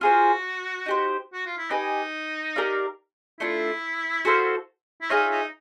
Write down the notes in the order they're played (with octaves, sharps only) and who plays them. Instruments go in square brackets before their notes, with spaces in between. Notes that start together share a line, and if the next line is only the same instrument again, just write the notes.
[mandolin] F4 G#4 C5 [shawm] F#4
[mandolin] D#4 G4 C5
[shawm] F#4
F4
E4
[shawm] D#4 [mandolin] G4 B4 D#5 G#5
[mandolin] G4 A#4 D5 F5
[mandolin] A3 D4 F4 [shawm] E4
[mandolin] F#4 A4 C5 F5
[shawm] E4
[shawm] D#4 [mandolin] F4 G#4 C#5 E5
[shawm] D#4